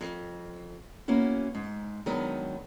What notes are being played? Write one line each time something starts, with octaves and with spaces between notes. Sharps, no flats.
F2
A#3 B3 C#4 E4 F#4
G#2
D#3 F#3 G#3 B3 D4